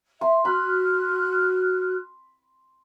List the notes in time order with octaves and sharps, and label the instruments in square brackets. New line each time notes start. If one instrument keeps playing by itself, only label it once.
[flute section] E5 [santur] C6
[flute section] F#4 F6 F#6 [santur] B5